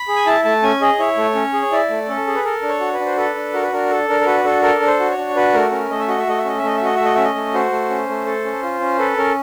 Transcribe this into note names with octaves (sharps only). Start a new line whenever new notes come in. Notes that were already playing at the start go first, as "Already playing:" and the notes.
Already playing: B5
G#4
G#5
E4 A5
A3 A5
C#4 G#5
G#4 D#5
E4 C#5
A3
C#4
G#4
E4 D5
A3
C#4 A4
G#4
B4
A4 A#4
D4
C#5
F#4
B4
D4
C5
A4 B4
D4
F#4 A#4
B4
D4 A#4
A4
D4 A#4
A#4
F#4 B4
D4 A4
A4 A#4
D4
C5
F#4
C#5
D4
F#4 B4
A3 A#4
C#4 A#4
A3 D#5
E5
F#4 D#5
E5
A3 D#5
E5
C#4 D#5
E5
A3 D#5
E5
F#4 D#5
A3 E5
D#5
C#4 E5
D#5
A3
F#4 C5
A3
C#4
A3
A4
C#4
F4
C#4
A4 B4
C#4 A#4